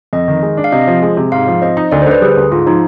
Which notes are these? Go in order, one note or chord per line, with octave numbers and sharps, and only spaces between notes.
F2 D#5
D#3
G#3
D4
F5
C3 D#5
F3
G#3
C3
G#2 F5
F3
C4 D#5
D#4 D#5
D2 D5
C5
D3
B4
G3 G#4
D2
G#2 F4
F3 D#4